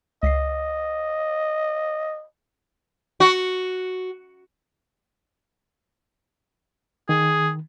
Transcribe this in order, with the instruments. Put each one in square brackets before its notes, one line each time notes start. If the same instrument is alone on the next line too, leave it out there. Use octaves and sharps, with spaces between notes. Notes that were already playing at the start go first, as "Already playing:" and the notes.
[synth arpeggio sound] C#2 B6 C7 [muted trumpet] D#5
[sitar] F#4
[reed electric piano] D#3 [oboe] G#4